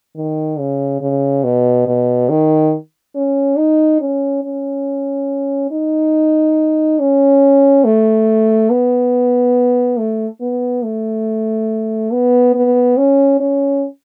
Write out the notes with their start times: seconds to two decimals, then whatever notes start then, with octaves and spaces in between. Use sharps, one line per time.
0.16 D#3
0.59 C#3
1.01 C#3
1.44 B2
1.87 B2
2.29 D#3
3.15 C#4
3.58 D#4
4.01 C#4
4.43 C#4
5.71 D#4
6.99 C#4
7.85 A3
8.70 B3
9.98 A3
10.41 B3
10.84 A3
12.12 B3
12.54 B3
12.97 C#4
13.40 C#4